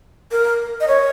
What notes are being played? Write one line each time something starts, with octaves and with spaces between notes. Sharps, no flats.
A#4
D#5
C#5